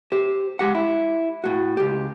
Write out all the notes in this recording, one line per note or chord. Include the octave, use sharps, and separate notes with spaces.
G4 C5
G#3 G4 F#5
E4
A2 F#4
C#2 G4